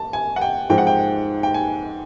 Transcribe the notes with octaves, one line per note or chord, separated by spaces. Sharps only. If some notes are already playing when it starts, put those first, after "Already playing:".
Already playing: A5
G#5
F#5
G5
G#2 F3 G#3 C4 G5
F#5
G5
G5
G#5